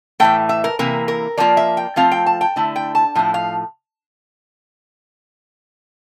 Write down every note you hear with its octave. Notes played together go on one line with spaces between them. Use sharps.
A2 E3 A3 G5
E5
A#4
C3 E3 A#3 A#4
A#4
F3 A#3 F4 D5
E5
G5
F3 A3 C4 F4 F5
G5
A5
G5
D3 A3 E4
G5
A5
A2 F3 E4
F5